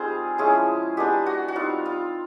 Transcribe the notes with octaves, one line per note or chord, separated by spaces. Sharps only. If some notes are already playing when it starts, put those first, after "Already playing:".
Already playing: G3 C4 D#4 F4 G#4 C5
F3 G#3 C#4 E4 G#4
G#3 B3 D4 G4
F#4
F#4
G3 C4 D#4 F4
F4